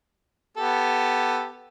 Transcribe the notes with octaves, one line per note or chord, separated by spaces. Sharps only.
B3 G4 A4